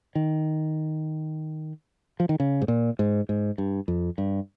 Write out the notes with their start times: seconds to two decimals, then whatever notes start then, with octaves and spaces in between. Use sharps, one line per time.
0.15 D#3
2.20 F3
2.29 D#3
2.40 C#3
2.62 G#2
2.68 A#2
2.99 G#2
3.29 G#2
3.58 G2
3.88 F2
4.18 G2